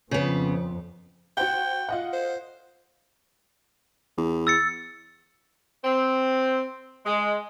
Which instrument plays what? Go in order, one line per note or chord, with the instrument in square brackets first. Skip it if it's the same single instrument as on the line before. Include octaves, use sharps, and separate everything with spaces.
[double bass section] F2 [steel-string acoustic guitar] C#3 B3
[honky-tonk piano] F#4 C5 F#5 [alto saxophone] G5
[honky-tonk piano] F4 D#5 F#5
[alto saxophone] C5
[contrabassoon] E2
[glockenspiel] E6 A6 C#7
[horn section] C4
G#3